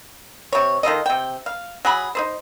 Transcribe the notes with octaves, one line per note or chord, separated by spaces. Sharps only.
C3 C#5
D#3 F4 A4 D#5
C3 G5
F5
F#3 G#4 B5
D#4 G#4 C5